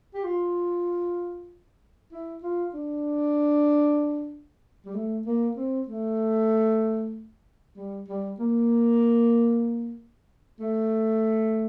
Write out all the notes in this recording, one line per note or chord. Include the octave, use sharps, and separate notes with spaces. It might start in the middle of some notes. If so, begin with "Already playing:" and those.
G4
F4
E4
F4
D4
G3
A3
A#3
C4
A3
G3
G3
A#3
A3